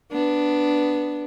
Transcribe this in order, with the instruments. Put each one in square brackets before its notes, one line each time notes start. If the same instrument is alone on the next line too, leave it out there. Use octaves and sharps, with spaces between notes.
[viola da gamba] B3 D4